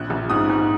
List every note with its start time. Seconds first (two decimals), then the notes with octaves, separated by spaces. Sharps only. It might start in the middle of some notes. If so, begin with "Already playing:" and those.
Already playing: A#1 F#6
0.10 A#1
0.30 G#2 D#6
0.50 G#2